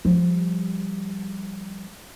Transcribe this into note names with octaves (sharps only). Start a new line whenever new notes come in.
F3 G3